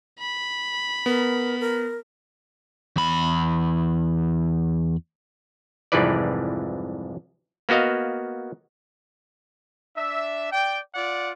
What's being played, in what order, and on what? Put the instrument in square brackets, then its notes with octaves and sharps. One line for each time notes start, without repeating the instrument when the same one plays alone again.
[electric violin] B5
[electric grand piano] B3 [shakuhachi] A#4
[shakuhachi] A#4
[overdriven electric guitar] E2 B5
[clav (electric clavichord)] C2 F2 G#2 E3 B4 D5
A#3 B3 F#4 D#5 F5
[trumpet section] D4 E5
D5 G5
F4 D5 F#5